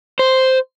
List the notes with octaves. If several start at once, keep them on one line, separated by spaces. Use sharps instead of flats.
C5